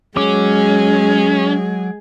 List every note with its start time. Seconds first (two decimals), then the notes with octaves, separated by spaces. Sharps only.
0.17 F#3 G#3 C#4 G#4 D6